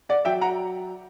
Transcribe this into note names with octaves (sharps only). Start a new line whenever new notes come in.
D5 F#5
F#3 E5 G5
F#5 A#5